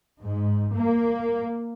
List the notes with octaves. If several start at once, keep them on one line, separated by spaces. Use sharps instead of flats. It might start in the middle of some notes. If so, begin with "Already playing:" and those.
G#2
A#3